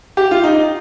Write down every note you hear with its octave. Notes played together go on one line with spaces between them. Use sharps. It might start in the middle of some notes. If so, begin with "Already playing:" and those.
G4
F4
D#4